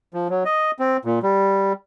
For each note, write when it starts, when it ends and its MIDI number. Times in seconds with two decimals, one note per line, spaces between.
0.14 0.28 53
0.30 0.43 54
0.45 0.71 75
0.79 0.97 60
1.05 1.19 46
1.23 1.73 55